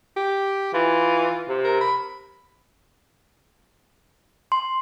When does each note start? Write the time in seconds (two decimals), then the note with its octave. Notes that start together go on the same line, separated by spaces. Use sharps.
0.16 G4
0.74 E3 F4
1.49 C3
1.65 A#4
1.81 B5
4.52 C6